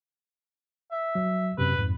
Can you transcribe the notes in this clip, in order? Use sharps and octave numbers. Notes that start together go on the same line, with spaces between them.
E5
F#3
F#2 C3 B4
F2 G#2